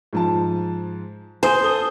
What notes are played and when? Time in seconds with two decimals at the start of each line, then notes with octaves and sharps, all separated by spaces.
0.13 G#2 F3 A5
1.43 C5 G#5 D#6
1.62 A4 D#6 G7